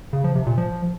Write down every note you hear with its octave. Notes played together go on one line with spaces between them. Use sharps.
C#3
F3
C3
A#2
F3